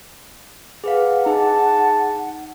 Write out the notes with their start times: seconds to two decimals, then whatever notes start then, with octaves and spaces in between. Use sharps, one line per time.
0.84 G#4 B4 F5 F#5
1.26 D#4 G#4 A5